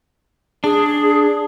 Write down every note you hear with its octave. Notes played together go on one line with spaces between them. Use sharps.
D4 G#4